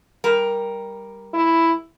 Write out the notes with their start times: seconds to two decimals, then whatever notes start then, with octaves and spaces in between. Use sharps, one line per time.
0.24 G3 A#4
1.33 E4